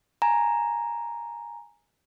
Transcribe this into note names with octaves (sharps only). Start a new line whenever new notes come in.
G#5 A#5